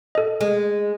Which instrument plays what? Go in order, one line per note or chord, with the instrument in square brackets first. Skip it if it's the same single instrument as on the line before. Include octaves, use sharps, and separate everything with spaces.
[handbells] A4 D#5
[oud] G#3